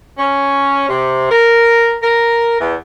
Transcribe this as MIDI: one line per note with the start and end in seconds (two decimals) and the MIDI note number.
0.18 0.86 61
0.88 1.26 48
1.31 1.96 70
2.03 2.58 70
2.60 2.75 40